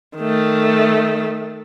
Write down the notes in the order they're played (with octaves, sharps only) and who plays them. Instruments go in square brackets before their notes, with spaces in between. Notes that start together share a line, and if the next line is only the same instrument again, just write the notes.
[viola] D#3 A3